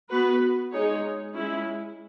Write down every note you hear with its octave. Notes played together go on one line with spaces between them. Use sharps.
B3 F#4 B4
G#3 D#4 G#4 C#5
G#3 C#4 E4